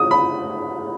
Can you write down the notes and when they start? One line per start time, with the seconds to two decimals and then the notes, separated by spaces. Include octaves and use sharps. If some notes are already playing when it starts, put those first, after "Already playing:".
Already playing: D#6
0.11 B5